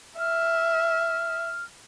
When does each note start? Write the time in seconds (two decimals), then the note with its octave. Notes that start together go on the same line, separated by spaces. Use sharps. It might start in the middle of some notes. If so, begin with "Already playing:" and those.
0.19 E5 F6